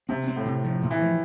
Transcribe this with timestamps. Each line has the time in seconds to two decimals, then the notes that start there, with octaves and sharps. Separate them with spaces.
0.09 C3 C4
0.28 C4
0.36 A2
0.46 C3
0.64 F3
0.82 A2
0.91 E3
1.00 F3